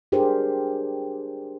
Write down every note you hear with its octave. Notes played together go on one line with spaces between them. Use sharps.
D4 G4 G#4 A#4 C5